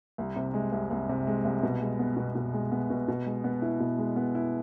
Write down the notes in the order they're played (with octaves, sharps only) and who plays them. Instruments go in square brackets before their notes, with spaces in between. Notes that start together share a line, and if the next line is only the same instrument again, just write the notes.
[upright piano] C2
C3
G#3
C2
C2
C3
G#3
C2
B2
G#3
B3
B2
B2
G#3
B3
B2
B2
G#3
B3
E4
B2
G#3
B3
E4